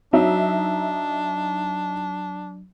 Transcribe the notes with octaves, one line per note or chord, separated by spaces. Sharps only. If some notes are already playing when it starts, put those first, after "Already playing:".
F#3 D4 D#4 E5